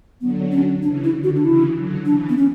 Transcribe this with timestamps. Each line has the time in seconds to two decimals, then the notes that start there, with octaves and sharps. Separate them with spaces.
0.21 D3 F#3 B3
0.52 C#4
0.83 C#3 E3 D4
1.04 E4
1.14 D3
1.24 F#4
1.36 D4
1.44 C#3 E3 E4
1.75 D3 F#3
2.06 C#3 E3 D4
2.29 B3
2.37 C#4